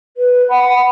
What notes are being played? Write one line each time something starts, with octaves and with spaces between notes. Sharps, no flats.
B4
F#5 B5